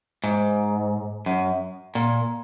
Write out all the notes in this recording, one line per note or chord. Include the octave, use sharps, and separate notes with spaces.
G#2
F#2
A#2